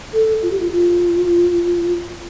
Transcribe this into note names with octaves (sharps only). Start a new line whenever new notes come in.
A4
F4
G4
F4
F4